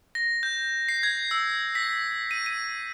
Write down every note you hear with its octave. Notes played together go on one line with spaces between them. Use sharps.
A#6
G6
C7
G#6
E6
B6
D#7
D#7